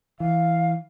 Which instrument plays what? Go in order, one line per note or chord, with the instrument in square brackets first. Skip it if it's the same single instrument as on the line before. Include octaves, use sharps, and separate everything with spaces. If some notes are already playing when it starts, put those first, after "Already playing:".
[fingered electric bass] E3 [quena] F5